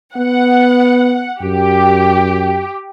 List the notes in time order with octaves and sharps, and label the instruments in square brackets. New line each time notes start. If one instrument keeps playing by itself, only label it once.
[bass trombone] B3 [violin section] F#5
[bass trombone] F#2 [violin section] G4